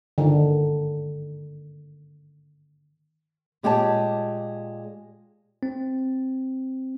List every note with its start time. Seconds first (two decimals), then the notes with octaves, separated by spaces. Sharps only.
0.18 D3 D#3
3.63 A#2 G#3 G4 B4 C#5 A5
5.63 C4